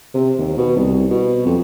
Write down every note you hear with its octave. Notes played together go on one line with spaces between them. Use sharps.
C3
D#2
B2
C2
B2
F2